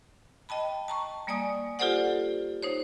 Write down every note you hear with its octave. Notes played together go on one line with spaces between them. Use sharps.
D#5 G5 A5 B5
A5 A#5 C#6
G3 A#3 D5 G#5 D#6
F4 G4 A4 C5 D5 F#5
D#4 C5 C#5